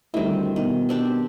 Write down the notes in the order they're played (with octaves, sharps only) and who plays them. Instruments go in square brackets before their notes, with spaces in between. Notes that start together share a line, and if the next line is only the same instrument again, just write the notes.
[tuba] D2 [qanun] D#3 C4 [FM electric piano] G3 E4
[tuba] B2 [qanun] D#3
[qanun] C4 D4 G4